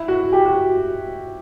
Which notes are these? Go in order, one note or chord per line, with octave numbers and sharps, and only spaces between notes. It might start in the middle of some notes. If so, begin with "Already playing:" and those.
Already playing: E4
F#4
G4
F#4